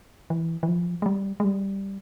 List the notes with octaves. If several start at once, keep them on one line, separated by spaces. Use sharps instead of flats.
E3
E3
F3
G#3
G3
G#3
G3